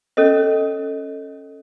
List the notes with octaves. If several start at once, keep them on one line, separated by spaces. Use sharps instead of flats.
C#4 A4 C#5 D#5